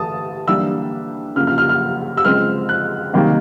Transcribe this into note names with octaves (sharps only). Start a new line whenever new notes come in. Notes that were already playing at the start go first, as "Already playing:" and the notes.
Already playing: E3 A3 A5 D#6
E3 G3 A#3 D4 E6
C#3 F3 A#3 F6
F6
F6
F6
E6
C#3 F3 G#3 C4 F6
F#6
C3 D#3 G3 A#3 D#4